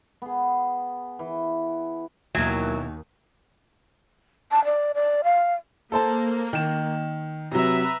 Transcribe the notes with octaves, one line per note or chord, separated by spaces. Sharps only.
B3 G#4
E3
D#2 B2 D#3 E3 F#3
A5
D5
D5
F5
A#3 A4 C5 A5
D#3 E7
C3 F#3 B4 E5 A#5